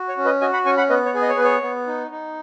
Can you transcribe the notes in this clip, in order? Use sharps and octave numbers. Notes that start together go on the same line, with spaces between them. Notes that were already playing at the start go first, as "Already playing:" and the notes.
Already playing: F#4
C#5
C#4
B4 D#5
F#4 D#5 G#5
F#5 B5
C#4 G#5 C#6
F#5 B5
B3 B4 D#5
C#5
G#4
D#5
C#5
B3 B4
C#5
B3
D#4
D#4